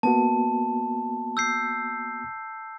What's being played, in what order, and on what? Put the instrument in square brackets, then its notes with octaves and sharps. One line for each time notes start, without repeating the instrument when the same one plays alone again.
[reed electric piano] A#3 B3 F#4 [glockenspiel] A5
[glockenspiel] E6 G6 C7